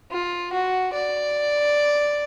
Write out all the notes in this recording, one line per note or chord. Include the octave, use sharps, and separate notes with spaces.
F4
F#4
D5